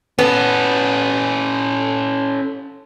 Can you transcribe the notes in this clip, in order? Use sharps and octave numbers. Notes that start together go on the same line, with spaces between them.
B3 C#4 A4